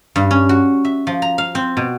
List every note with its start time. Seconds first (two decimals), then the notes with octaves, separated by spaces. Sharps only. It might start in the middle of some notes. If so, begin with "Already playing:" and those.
0.16 G2
0.31 C#4
0.49 F#4
0.85 E5
1.07 F3
1.22 A#5
1.38 F5
1.55 C4
1.77 B2